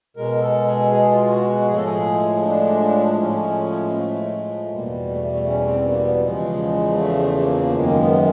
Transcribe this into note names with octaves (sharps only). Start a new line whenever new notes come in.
B2 G#3 A#4
A4
G#4
G#4
F4
F#4
F#4
A2 F3 G#3 G#4
A4
G#4
D4
A2 F3 G#3 C#4
A#3
A3
E2 B2 G3 A#3
A3
A3
C#4
C4
A#3
B3
E2 C#3 F3 G#3
A3
A#3
F#2 D#3 G#3 A#3
B3